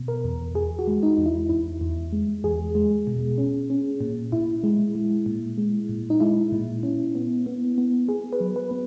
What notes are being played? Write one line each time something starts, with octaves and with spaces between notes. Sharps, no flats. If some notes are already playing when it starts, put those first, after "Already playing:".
Already playing: B2
A#4
E2
E2 G#4
F#4
G#3
D#4
E2
E4
E2 E4
E2
G#3
E2 G#4
G#3
B2
C#4
C#4
A#2
A#2 E4
G#3
G#3
A#2
G#3
A#2
D#4
G#3 E4
A#2
C#4
B3
B3
B3
B3 G#4
B4
F#3
B4
B3